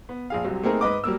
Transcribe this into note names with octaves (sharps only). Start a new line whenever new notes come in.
B3
A#1 G#4 F5
C2 C3 F#3
A3 A#3 C4 D#4 G#4 A#4
G#2 B4 D#5 D6
F#3 G3 A#3 E6